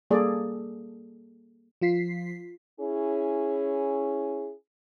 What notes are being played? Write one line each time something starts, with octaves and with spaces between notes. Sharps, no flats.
G3 A#3 G#4 A4 D5
F3 F4 B6 C7
C#4 E4 G#4